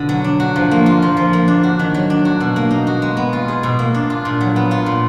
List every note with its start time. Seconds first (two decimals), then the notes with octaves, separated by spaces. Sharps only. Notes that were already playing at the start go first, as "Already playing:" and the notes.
Already playing: B2 D3
0.09 F#3
0.24 D4
0.40 F#4
0.56 F3
0.71 A#3
0.86 F4
1.02 F3
1.17 F3
1.33 A#3
1.48 D4
1.63 F#4
1.79 D#3
1.94 F#3
2.10 D4
2.25 F#4
2.40 B2
2.56 A#3
2.71 D#4
2.87 F#4
3.02 G#3
3.17 B3
3.33 F4
3.48 G#4
3.63 B2
3.79 A#3
3.94 D4
4.10 F4
4.25 A#2
4.41 F#3
4.56 B3
4.71 F4
4.86 A#2